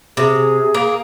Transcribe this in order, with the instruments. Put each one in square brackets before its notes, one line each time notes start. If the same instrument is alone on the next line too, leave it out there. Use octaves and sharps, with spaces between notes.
[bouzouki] C3 [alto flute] G#4
[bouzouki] A#3